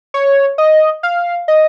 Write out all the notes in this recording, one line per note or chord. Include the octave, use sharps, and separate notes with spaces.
C#5
D#5
F5
D#5